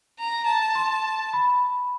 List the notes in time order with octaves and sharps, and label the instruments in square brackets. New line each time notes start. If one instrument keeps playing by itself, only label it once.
[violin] A#5
A5
[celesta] C6
B5